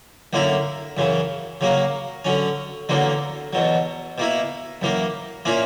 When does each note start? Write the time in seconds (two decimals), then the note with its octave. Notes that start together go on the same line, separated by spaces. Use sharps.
0.33 F#2 D3 A#3 E4
0.97 F#2 C#3 E3
1.61 C#3 F#3 A#3
2.25 D3 F#3 C#4
2.89 E2 D3 F#3 A#3
3.53 E2 B2 F#3
4.18 B2 A#3 E4
4.82 F#2 E3 A#3
5.45 A#2 A#3 C#4 E4